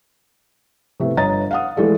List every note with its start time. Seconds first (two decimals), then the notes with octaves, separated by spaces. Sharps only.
1.00 C3 A3 B3 E4
1.17 G1 C#5 D#5 A#5 A6
1.51 F5 F#5 D#6
1.77 E3 G#3 A3 E4 A4 D5